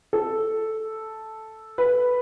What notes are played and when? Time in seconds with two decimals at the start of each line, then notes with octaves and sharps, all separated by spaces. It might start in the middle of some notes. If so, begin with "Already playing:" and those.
0.13 A4
1.78 B4